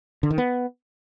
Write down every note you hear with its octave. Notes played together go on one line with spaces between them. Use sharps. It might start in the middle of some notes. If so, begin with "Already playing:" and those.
D3
D#3
B3